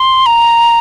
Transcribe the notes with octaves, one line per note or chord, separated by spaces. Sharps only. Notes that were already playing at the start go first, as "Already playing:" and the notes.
Already playing: C6
A#5